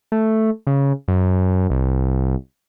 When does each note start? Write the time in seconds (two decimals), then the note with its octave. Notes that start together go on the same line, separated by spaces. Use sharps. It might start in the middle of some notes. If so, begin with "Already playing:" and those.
0.12 A3
0.67 C#3
1.08 F#2
1.70 C2